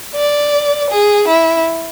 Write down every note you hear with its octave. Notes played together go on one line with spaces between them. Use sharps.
D5
G#4
E4